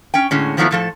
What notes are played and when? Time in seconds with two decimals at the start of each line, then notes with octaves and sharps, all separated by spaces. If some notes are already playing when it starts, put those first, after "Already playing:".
0.14 C#4 G5
0.31 A2 D3 G#3 C#4
0.57 D#3 F3 F#3 A3 B3 E4
0.71 A2 F3 A4